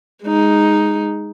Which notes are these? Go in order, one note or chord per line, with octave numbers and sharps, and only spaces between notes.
G#3 D#4